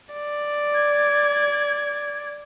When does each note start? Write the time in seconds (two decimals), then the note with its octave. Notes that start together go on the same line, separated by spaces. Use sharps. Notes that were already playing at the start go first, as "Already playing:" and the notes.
0.14 D5
0.74 G#6